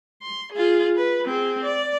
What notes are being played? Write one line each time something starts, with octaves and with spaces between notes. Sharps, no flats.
C6
F4 G#4
B4
C4 G#4
D5